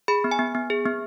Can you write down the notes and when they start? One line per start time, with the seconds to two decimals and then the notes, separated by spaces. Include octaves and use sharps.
0.08 G#4 B5
0.24 B3
0.31 G#5
0.39 B3
0.55 B3
0.70 G#4
0.86 B3